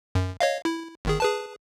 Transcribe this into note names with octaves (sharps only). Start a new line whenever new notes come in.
F#2
C#5 D#5 F5
E4
G1 D#3 G#4
G#4 B4 A5